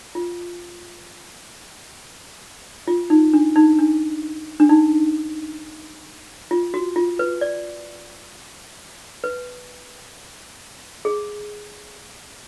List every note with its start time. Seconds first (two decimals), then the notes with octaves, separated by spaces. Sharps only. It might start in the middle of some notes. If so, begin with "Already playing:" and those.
0.15 F4
2.88 F4
3.10 D#4
3.34 D4
3.56 D#4
3.79 D4
4.60 D4
4.69 D#4
6.51 F4
6.74 F#4
6.96 F4
7.19 B4
7.41 D5
9.24 B4
11.05 G#4